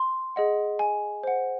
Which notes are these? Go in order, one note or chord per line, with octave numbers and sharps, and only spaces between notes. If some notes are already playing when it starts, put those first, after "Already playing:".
Already playing: C6
G#4 D#5 F#5
G#5
C5 F#5